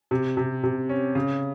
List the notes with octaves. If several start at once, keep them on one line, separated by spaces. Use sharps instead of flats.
C3
C3
C3
C#4
C#3